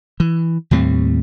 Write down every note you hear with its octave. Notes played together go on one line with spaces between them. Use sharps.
E3
D#2 A2 G3 C4